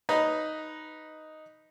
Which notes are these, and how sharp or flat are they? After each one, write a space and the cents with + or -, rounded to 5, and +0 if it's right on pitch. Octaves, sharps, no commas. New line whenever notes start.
D#4 +0 B4 +0 A#5 +0